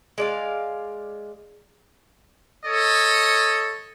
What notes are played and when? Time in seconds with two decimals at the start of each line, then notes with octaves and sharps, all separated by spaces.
0.18 G#3 D5 F5
2.66 A4 C#5 D#5